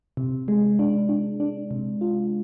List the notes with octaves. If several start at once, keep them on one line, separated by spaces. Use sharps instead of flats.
C3
G#3
D4
D4
D4
C3
F4